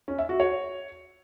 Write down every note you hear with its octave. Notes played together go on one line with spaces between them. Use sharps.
C#4
E5
F#4
C#5